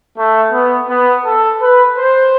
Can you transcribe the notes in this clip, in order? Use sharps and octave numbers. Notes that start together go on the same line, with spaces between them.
A3
B3
B3
A4
B4
C5